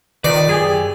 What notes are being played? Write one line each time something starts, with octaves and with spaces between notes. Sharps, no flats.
D#3 F4 B4 D5
F#2 G4 G#4 G#5